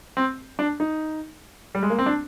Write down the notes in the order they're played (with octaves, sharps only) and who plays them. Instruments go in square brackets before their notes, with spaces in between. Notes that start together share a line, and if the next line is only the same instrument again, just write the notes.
[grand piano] C4
D4
D#4
G3
G#3
A#3
C4
D4